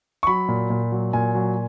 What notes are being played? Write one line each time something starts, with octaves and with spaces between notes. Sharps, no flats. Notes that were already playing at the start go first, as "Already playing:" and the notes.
C#6
F#3 B5
A#2
A#2
F#3
A#2 G#5
F#3